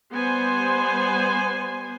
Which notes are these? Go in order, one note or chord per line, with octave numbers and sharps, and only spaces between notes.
G3 B3 C5 G#5 C6